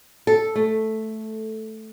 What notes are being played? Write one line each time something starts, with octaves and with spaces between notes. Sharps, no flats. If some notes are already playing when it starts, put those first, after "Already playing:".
A4
A3